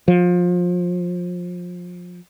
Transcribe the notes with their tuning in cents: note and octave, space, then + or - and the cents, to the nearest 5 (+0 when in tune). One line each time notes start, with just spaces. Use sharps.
F3 +25